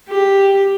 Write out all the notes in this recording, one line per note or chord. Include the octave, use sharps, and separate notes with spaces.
G4